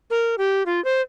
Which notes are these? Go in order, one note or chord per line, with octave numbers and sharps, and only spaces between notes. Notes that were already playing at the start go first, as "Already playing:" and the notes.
A#4
G4
F4
C5